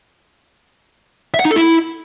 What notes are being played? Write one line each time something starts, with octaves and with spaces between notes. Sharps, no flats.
E5
F#5
D#4
A4
E4